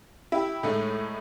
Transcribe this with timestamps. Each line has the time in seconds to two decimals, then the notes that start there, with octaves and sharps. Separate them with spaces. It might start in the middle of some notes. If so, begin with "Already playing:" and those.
0.32 E4 G4
0.63 A2 G#3 A3 D#4